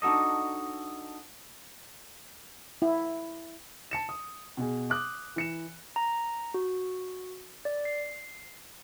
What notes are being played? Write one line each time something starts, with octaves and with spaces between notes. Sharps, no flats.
D4 D#4 F#4 A4 D#5
E4
A5 C#7 E7
D#6
B2 G#4
D6 D#6 F#6
E3 C#7 E7
A#5
F#4
D5
C7